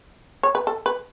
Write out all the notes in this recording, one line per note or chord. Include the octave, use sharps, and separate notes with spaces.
C#5
B4
A4
B4